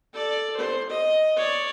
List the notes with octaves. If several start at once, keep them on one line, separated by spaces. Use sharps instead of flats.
A4 D5
C5
D#5
C#5 D5